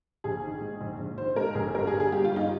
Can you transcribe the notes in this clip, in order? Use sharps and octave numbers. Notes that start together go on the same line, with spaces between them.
A#1 G#4
D#3
G#2
A#1
A#1
D#3 C5
G#2 A#4
A#1 G#4
G1 A#4
G#4
D3
G#4
G2 G4
F4
G1
D#4